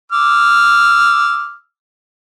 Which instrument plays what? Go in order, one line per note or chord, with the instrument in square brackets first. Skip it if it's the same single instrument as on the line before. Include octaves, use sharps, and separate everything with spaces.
[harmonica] D6 E6 F6